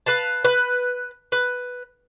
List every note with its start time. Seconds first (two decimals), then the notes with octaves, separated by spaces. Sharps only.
0.06 B4 F5 A5
0.45 B4
1.32 B4